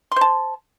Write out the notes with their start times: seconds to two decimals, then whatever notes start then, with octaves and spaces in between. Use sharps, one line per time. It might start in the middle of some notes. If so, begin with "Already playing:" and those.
0.12 C6
0.16 C5
0.21 A5